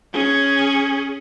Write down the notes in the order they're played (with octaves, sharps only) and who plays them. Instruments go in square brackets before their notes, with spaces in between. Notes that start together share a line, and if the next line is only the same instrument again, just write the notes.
[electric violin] C#4 G#4